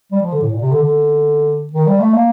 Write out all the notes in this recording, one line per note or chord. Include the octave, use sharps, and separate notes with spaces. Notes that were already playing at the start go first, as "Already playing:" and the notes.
G3
F3
D3
A2
A#2
C3
D3
D3
D#3
G3
A3
A#3